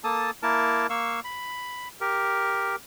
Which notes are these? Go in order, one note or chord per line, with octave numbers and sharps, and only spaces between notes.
A#3 A4 A5 D#6
A#3 E4 A#4 A5
A#3 F5 C#6 E6
B5
G4 A#4